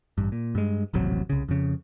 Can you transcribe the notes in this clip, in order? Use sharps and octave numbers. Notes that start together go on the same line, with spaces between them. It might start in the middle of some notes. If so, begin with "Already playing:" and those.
A1 G2
A#2
G2 G#3
D#1 A1 C3 F#3
C2 C#3
F2 C#3